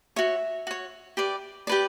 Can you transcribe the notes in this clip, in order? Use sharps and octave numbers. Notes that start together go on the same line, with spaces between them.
F#4 C#5 E5
F#4 C#5
G4 B4 D5
G4 B4 D5